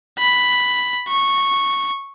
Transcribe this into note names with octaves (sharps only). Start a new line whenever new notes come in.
B5
C#6